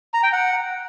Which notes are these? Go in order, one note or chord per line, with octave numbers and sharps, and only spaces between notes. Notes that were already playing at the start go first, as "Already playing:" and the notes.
A#5
G5
F#5